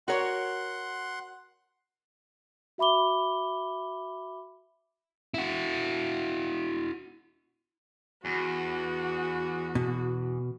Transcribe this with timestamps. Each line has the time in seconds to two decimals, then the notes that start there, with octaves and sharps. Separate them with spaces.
0.08 F#4 A#4 C#5 F#5 C6
2.78 F#4 E5 B5 D6 G7
5.34 E4 F#4
8.25 E2 F#4
9.75 B2